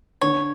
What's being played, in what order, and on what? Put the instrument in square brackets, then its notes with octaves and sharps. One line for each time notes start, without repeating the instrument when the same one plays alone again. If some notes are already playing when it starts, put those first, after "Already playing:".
[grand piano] D3 [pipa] C#5